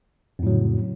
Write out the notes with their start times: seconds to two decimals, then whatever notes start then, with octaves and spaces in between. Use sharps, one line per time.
0.39 F2
0.43 A2
0.47 F#3
0.50 C#3